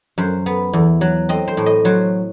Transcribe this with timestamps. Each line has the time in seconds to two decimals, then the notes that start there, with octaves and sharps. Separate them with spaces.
0.18 F#2 C5
0.46 B3
0.73 E2
1.01 F#3
1.29 C4 D#5
1.48 C5
1.57 A2
1.66 D#5
1.85 F#3 C5